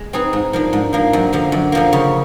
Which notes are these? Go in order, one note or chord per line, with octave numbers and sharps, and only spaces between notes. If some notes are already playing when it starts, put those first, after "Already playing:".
Already playing: G#3
C4 D#4 G#4 B4
G#2
F3 A#3 D4
G#2
F3 A#3 D4
F#2
D3 F3 A#3
F#2
D3 F3 A#3
C#3